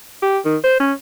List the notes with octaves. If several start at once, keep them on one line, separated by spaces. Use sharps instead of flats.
G4
D#3
C5
C#4